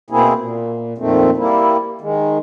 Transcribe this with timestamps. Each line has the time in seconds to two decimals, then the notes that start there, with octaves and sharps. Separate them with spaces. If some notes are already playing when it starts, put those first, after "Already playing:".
0.10 B2 A#3 C4 E4 G#4
0.39 A#2
0.98 F2 A#2 D#3 A3 C4
1.37 G3 A#3 E4
2.01 D#3 G#3